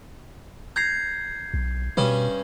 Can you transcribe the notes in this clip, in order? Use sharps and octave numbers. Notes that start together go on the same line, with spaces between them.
A#5 G6 G#6 C7
B1
G2 B2 C#4 D#6